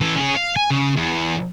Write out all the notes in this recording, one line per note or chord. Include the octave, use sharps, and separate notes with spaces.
E3 A4
C#4 G#4
F5
G#5
C#3
E2